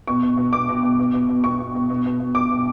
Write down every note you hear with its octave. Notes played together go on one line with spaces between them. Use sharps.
B2 C#6
B2
B2
B2 D6
B2
B2
B2
B2
B2
B2 C#6
B2
B2
B2
B2
B2
B2 D6
B2